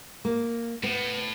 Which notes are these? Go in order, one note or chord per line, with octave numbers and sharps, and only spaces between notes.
A#3
A2 B3